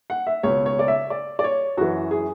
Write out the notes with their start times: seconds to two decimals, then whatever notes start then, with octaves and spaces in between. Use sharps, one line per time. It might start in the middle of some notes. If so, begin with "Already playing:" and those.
0.10 F#5
0.27 E5
0.43 C#2 B2 C#5
0.66 C#5
0.79 D5
0.88 E5
1.10 D5
1.39 D5
1.44 C#5
1.77 F#2 E3 F#4
2.11 G#4